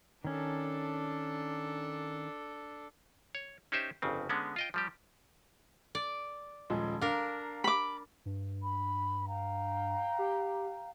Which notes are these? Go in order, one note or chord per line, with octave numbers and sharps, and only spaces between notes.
D#3 C#4 D4 A4
C#5
C#4 D#4 G4 C5 E5
G1 F2 C#3 C4
D3 G#3 B3 C#4
F4 D#5 G5
F3 G3 G4
D5
D#1 F3 G#3
D4 A#4 F5 A#5
B5 D6
G2
B5
F5 G5 A#5
G4